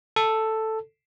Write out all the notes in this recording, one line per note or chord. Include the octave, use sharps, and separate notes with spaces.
A4